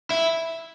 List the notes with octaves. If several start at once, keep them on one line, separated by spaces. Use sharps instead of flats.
E4